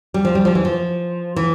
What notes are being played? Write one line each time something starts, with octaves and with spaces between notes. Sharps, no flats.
G3
F3
G3
F3
E3
F3
E3